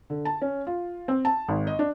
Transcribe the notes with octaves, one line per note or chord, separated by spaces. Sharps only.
D3
A5
C#4
F4
C4
A5
G#1
D#5
D4